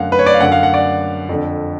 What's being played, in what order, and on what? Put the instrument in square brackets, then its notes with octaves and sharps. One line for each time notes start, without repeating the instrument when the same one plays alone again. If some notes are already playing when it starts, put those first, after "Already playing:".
Already playing: [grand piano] F#2 D3 F5 F#5
B4
C#5
D5
F5
F#2 D3 F#5
F5
F#5
D5
F2 D3